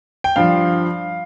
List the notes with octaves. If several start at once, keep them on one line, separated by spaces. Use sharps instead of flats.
G5
G2 F3 F5